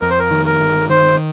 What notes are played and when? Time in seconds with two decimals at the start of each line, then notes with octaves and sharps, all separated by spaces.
0.01 F2 A#4
0.10 C5
0.19 A#4
0.31 D#3
0.46 A#4
0.60 G1
0.89 D#3 C5